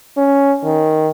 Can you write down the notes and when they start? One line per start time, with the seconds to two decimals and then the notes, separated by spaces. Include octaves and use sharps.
0.17 C#4
0.63 D#3